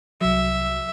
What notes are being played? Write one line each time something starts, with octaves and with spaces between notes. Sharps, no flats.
C2 F#3 E5